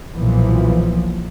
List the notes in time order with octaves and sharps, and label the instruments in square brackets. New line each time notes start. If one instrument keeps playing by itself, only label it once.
[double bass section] B1 A#2 E3 F3